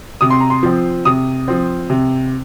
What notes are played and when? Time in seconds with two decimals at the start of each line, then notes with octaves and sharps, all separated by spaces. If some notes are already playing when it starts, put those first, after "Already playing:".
0.21 C3 D#6
0.30 C6
0.40 A#5
0.50 C6
0.63 F3 C4
1.05 C3 D#6
1.48 F3 C4
1.90 C3